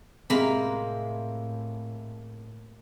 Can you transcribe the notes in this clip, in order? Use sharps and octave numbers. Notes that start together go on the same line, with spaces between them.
A2 C3 G#3 A#3 B5